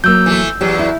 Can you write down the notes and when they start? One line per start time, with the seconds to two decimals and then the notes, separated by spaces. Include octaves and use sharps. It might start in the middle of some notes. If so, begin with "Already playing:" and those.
0.04 F#3 A#3 E6 G6
0.26 E3 A3
0.61 E2 F#3 G4
0.79 E4